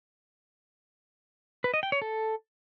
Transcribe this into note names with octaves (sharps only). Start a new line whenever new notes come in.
B4
D#5
G5
C#5
A4